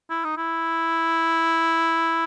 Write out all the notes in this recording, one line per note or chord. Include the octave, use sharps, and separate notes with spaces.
E4
D#4
E4